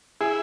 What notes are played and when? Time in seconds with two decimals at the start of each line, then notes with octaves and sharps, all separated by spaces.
0.21 E4 G#4